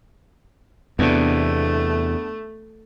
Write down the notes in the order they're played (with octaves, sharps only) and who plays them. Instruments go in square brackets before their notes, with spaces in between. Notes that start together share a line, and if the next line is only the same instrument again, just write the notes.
[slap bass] E2 C3 [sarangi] A3 [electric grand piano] B3 D4